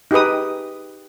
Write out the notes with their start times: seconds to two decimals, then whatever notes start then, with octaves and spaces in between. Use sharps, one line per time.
0.11 D#4 G4 G#4 B4 D#6